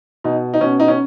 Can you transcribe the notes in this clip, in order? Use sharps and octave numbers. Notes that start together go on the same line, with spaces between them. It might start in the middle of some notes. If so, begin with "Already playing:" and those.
B2 D#4
D#4
B2 C#4
D#4
C#4